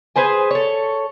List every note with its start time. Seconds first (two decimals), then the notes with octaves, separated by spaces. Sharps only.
0.16 G#4 B4 C5 G#5
0.51 A4 C#5